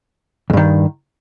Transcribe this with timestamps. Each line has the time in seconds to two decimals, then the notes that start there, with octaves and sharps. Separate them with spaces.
0.50 E2
0.53 G2
0.57 D#3